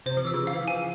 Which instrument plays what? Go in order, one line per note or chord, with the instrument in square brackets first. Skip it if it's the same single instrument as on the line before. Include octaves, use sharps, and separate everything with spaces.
[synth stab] C3 [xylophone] C5
[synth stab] F3
[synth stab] E3 [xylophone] E6
[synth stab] C#3
[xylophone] F5
[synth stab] E3
F3
[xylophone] G#5